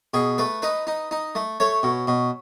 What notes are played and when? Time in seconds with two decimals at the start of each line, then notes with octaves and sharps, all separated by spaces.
0.14 B2 G#4
0.38 A3 B4
0.62 D#4 B4
0.87 D#4
1.11 D#4
1.35 A3
1.60 A3 C#5
1.83 B2
2.08 B2